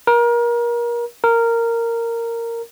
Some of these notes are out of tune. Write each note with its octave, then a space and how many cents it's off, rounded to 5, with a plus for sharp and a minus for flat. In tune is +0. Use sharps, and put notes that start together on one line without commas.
A#4 +30
A#4 -10